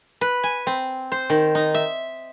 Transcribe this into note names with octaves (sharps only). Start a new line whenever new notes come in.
B4
G#5
C4
C5
D#3
D#4
E5